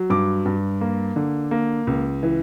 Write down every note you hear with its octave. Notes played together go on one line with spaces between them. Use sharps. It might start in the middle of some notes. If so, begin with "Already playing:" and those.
Already playing: F#3
G2 D6
G2
A#3
D3
A#3
C#2
E3